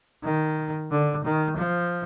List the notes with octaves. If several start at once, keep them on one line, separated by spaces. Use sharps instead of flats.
D#3
D3
D#3
F3